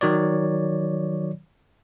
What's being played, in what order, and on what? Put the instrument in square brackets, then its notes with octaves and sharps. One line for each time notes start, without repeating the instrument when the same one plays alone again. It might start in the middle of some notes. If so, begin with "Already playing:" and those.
[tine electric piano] D#3 F#3 C#5 D5